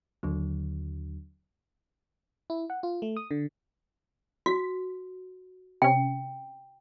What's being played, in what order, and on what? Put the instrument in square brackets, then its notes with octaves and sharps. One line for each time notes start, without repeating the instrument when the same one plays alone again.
[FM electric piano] D#2 D3 F#3
E4
F#5
F4
A3
D#6
D3
[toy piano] F#4 [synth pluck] B6
[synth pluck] C3 C#4 [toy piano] G5